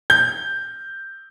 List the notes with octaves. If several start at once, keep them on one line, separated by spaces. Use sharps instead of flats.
G6